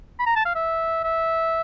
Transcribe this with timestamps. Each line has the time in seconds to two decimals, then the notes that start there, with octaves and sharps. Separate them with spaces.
0.19 B5
0.26 A#5
0.36 A5
0.45 F5
0.55 E5
1.04 E5